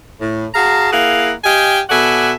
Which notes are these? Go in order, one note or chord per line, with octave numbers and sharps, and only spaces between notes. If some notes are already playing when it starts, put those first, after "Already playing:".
A2
F#4 G#4 F5 A5 A#5
A#3 E4 G#4 A#4 F5 F#5
G4 D#5 F5 G5 G#5
B2 A4 D5 E5 F#5 G#5